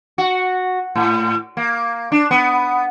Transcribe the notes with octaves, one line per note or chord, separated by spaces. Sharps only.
F#4
A2
A#3
D4
B3